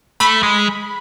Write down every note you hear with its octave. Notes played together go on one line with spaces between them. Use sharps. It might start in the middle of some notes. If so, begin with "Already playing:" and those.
A3 B5
G#3